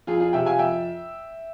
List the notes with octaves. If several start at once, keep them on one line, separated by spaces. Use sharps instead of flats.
F2 F4 G#4
F4 G#4
C3 F3 E5 G5
F5 G#5
F2 E5 G5